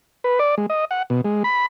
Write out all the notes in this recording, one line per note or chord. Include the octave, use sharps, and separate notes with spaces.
B4
D5
G#3
D#5
F#5
B2
G#3
B5